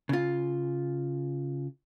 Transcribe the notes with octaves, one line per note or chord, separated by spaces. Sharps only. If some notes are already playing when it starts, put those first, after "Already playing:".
C#3 F4